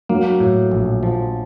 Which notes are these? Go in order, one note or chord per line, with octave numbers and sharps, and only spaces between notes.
F#3 A#3
A2
A#1
F3